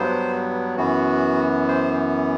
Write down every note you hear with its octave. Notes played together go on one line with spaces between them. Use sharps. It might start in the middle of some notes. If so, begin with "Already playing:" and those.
Already playing: G2 F#3 B3 C5
F#2 E3 B3 F#4
C5